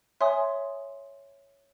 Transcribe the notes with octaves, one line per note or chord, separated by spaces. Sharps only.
C#5 E5 G#5 C6 D#6